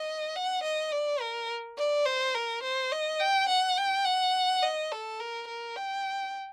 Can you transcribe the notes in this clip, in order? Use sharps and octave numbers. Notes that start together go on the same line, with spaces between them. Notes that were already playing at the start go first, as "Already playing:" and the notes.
Already playing: D#5
F#5
D#5
D5
A#4
D5
C5
A#4
C5
D#5
G5
F#5
G5
F#5
D#5
A4
A#4
A#4
G5